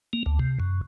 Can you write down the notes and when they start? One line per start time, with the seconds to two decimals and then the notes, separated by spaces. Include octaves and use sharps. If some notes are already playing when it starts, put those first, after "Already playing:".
0.13 A#3
0.26 D2
0.39 C3
0.60 F#2